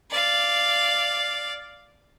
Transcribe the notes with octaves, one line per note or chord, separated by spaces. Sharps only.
D5 F5